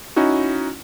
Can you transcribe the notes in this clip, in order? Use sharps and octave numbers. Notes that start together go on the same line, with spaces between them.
C#4 D#4 E4 F#4